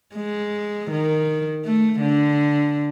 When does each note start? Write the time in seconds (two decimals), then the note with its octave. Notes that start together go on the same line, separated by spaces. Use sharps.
0.15 G#3
0.91 D#3
1.65 A3
2.00 D3